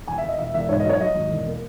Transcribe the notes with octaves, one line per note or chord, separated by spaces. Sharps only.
E1 G#5
E5
E1
D#5
E1 E5
E1 E5
G#2 C#5
D#5
F#3 C#5
F#3 D#5
G#1
E1
A#3